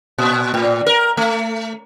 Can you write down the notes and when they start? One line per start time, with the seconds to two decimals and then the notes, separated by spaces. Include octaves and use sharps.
0.18 A#2
0.54 A2
0.86 A#4
1.17 A3